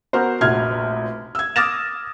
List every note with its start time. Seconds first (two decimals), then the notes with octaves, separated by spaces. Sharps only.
0.13 B3 F#4 A#4 C5
0.41 F1 A#1 F#4 F6 G#6
1.35 E6 G#6
1.56 D6 D#6 F6 A6 A#6 E7